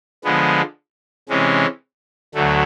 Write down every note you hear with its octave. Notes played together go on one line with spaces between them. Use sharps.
D3 F3 G#3 B3
C3 E3 G#3 C#4
D2 D3 F#3 A3